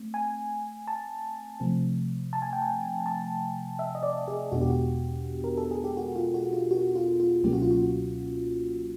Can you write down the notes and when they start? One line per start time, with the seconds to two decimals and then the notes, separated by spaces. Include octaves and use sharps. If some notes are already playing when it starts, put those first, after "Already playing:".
Already playing: A3 C4
0.14 G#5
0.88 A5
1.60 C3 F3 A3 C4
2.33 A5
2.42 G#5
2.53 G5
2.62 G#5
3.06 A5
3.79 E5
3.95 D#5
4.03 D5
4.28 G#4
4.52 E2 B2 G#3 B3 D4 F#4
4.61 G4
4.70 F#4
5.44 A#4
5.58 A4
5.71 G#4
5.84 G4
5.97 F#4
6.16 F4
6.34 F#4
6.53 F4
6.71 F#4
6.96 F4
7.20 F4
7.43 C#2 B2 F#3 A#3 C#4 G4
7.53 F#4
7.62 F4
7.71 F#4